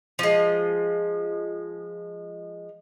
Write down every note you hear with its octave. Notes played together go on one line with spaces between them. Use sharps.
F3 G#3